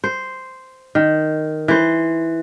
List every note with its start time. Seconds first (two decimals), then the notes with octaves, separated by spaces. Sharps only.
0.04 C5
0.95 D#3
1.68 E3 C5